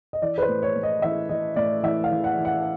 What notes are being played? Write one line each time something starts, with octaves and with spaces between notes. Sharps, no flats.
D#5
E3 D5
B4
C5
A2
C#5
A2
D#5
E3 E5
E3 D#5
A2 D5
E3 E5
F5
E3
F#5
E3
F#5